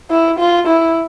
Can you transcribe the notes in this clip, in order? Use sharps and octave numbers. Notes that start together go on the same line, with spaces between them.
E4
F4
E4